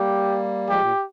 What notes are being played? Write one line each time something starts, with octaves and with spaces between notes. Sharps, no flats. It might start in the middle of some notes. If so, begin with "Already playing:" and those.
Already playing: G3 A#3 G4
F3 G#3 G4
A#2